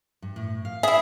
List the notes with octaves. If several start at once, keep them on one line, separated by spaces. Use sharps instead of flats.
G2
A2
F5
E4 G#4 E5